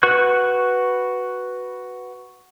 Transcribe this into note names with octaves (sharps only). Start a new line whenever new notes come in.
F#4 B4 C#6 F#6